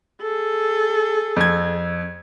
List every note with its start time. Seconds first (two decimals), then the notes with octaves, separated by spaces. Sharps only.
0.21 G#4 A4
1.36 F2 G#6